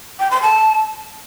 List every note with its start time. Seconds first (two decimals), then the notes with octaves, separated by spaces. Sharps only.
0.19 G5
0.31 C6
0.42 A5